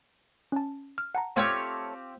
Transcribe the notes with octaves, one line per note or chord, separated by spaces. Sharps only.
C#4 A5
F6
F#5 A5 A#5
A3 C4 F4 G4 C#5 F6